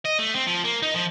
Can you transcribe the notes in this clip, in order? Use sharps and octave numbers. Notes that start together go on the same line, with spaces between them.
D#5
A3
C4
F3
A#3
D#4
F3